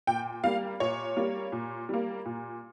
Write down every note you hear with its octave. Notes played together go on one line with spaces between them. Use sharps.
A#2 G5
G3 A#3 F5
A#2 C#5
G3 A#3
A#2
G3 A#3
A#2